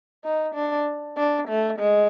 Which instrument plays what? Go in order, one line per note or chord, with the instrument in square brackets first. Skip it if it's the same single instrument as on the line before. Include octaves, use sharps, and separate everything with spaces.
[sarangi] D#4
D4
D4
A3
G#3